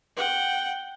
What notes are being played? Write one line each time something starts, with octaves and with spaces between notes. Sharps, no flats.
F#5 G5